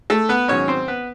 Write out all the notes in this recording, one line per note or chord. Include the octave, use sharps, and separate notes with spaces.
A3 A4
B3 B4
G#2 D#3 F#3 C#4 C#5
C4 C5
B3 B4